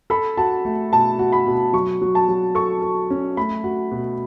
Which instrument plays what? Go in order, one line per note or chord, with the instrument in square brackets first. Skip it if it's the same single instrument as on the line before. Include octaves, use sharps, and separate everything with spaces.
[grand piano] A4 [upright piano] B5
[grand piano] F#4 [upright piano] A5
[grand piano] A3
[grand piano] B2 [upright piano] A5
[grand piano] F#4
[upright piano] B5
[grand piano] B2
[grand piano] F#3 [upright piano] C#6
[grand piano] F#3
[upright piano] A5
[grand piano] F#3
[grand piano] A4 [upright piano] C#6
[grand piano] A4
C#4
[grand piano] A3 [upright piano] B5
[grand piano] F#4
B2